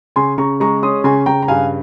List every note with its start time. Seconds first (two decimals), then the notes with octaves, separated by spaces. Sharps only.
0.16 C#3 G#5 C6
0.38 C#3 A#5 C#6
0.60 G#3 A#5 C#6
0.83 C#4 C6 D#6
1.04 C#3 G#5 C6
1.26 C#3 G5 A#5
1.42 A#5
1.48 G2 F5 G#5